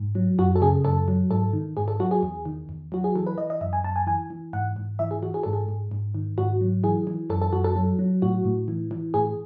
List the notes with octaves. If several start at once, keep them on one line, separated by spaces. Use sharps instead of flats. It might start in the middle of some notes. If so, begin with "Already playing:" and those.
Already playing: G#2
F#3
F#2 F#4
A4
C#3 G#4
F#2 A4
F#3
G#2 A4
D#3
G#2 G#4
A4
F#3 F#4
G#4
E2
D#3
E2
F#3 F#4
G#4
E3 A4
B4
E3 D#5
D#5
F#2 E5
G#5
F#2 A5
G#5
E3 G#5
E3
G#2 F#5
G#2
E3 E5
G#4
E3 F#4
G#4
G#2 A4
G#4
G#2
G#2
D#3
G#2 F#4
F#3
E3 G#4
E3
F#2 A4
A4
F#2 F#4
A4
F#3
F#3
A2 F#4
A2
E3
E3
A2 G#4